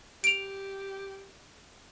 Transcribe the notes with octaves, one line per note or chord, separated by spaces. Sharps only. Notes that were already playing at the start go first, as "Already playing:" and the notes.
G4 D7 F7